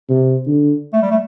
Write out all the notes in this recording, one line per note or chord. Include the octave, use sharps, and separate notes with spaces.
C3
D3
A3
G3
A3